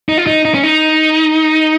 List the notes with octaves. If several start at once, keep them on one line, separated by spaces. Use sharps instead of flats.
D#4
F4
D#4
D#4
C#4
D#4